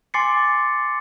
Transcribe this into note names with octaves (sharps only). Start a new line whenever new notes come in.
G#5 C6 D6 A6 C7 C#7